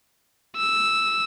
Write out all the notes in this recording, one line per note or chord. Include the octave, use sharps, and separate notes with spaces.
E6